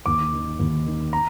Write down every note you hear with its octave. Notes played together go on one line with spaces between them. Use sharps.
D#2 D6
D#3
D#2
D#3
A#5